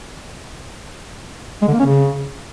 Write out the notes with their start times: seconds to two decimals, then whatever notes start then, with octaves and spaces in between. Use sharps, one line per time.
1.62 G#3
1.68 D3
1.73 A#3
1.79 C#4
1.85 C#3